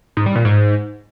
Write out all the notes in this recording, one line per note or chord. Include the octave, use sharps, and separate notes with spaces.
G#2
G3
A#2
G#2